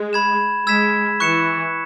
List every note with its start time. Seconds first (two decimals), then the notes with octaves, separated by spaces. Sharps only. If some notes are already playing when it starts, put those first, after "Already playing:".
Already playing: G#3
0.13 B5 G#6 E7
0.67 G#3 E6 G#6 B6 E7
1.20 E3 C#6 F#6 C#7 E7